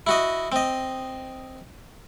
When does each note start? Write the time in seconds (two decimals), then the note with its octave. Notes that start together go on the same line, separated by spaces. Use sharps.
0.07 E4 F#4 D#5
0.52 C4 D#5